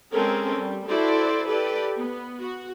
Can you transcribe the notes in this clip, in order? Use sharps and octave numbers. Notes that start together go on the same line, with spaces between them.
G#3 C4 C#4 A4 A#4
G3
E4 F#4 A4 C5 D5
G4 A4 B4 D5
B3
F#4